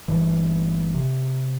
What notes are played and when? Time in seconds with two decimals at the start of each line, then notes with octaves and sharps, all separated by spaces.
0.08 G1 G2 E3
0.95 C3